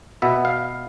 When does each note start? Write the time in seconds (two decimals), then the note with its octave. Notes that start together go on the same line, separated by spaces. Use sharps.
0.22 B2 B3 E5
0.45 F5